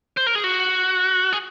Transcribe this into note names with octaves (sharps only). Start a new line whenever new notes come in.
C5
A#4
G#4
F#4
G#4